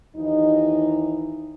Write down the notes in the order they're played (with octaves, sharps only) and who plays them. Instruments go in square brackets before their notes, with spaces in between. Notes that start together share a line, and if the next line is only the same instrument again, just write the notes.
[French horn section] D#2 E3 D#4